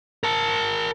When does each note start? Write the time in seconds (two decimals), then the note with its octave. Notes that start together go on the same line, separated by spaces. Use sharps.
0.23 A#4 A5